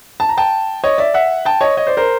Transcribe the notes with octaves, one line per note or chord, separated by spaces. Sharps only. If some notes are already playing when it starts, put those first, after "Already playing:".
A5
A#5
G5 A5
C#5 D#5
D5 E5
E5 F#5
G5 A5
C#5 D#5
C#5 D#5
C5 D5
A#4 C5